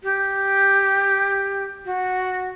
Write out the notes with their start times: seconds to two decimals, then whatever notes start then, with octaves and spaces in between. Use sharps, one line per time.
0.03 G4
1.85 F#4